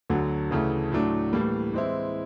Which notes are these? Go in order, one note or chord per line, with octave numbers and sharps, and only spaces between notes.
D2 D3 F#3
D2 C#3 E3 A3
A2 F#3 A3 D4
A2 E3 G3 A#3
E3 G#3 C4 E4